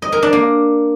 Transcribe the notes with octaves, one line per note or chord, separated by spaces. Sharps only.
D#5
A#4
D4
A#3